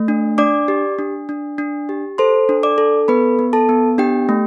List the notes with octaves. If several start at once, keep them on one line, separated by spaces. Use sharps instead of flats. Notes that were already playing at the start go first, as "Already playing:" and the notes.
Already playing: A3
D4
D4 D5 D6
G4
D4
D4
D4
G4
A4 C5 C6
D4
D5 D6
A4
B3 B4 B5
B3
A4 A5
B3
D4 G4 G5
A3